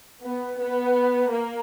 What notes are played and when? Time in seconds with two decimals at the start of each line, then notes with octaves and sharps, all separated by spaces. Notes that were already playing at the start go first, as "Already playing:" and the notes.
0.24 B3
0.60 B3
1.31 A#3